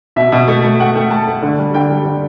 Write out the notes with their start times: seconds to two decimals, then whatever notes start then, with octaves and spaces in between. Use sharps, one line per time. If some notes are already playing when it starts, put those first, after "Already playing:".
0.16 B2 E5
0.32 B2
0.48 A3
0.64 A3
0.80 A3 F#5
0.95 A3 G5
1.11 A3 A5
1.27 A3
1.42 D3
1.59 G3
1.74 D3 G5
1.90 G3
2.06 D3